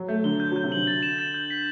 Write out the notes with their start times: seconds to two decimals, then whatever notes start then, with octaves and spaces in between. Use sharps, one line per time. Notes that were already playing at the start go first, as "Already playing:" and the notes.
Already playing: F#3
0.09 A3 G6
0.24 D3 G7
0.40 G6
0.52 F#3 G6
0.64 C3
0.72 D3 F#7
0.87 A6
1.03 E7
1.18 A6
1.34 G6
1.50 B6